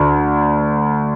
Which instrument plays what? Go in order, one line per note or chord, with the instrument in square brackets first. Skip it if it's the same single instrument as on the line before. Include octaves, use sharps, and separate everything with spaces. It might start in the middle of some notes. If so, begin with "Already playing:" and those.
Already playing: [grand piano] D2